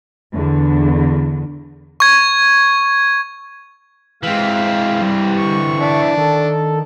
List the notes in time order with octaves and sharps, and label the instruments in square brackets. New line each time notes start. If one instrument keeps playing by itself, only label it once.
[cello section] E2 D3
[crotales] C#6 G#6
[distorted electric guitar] E3 C4 [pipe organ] G#3 F5 [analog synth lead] B6
[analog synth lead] G3
[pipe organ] D3 C#6
[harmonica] D4 [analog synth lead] E5
[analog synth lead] D#3 [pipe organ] A4